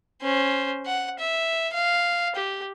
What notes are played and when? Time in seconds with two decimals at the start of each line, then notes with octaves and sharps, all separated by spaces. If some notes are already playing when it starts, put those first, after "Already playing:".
0.22 C#4 C5
0.86 F#5
1.19 E5
1.73 F5
2.36 G4